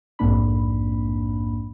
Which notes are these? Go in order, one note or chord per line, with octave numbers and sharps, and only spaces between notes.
A#1 F2 G#2 A#3 D4 B5